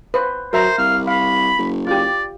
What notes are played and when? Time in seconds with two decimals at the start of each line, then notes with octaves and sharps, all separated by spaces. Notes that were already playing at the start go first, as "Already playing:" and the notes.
0.14 B4 C5
0.53 F#3 A#4 C5 E5 A#5
0.78 C2 F5
1.07 F5 B5
1.58 F#1
1.87 F4 G4 D5